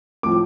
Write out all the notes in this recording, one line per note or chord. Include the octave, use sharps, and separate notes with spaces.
A2 F3 D6